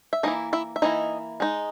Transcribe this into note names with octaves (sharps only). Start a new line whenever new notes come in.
E5
E3 A#3 D#4 E4 D#5
E4 E5
E5
E3 A#3 D#4 E4 D#5
G#3 D#4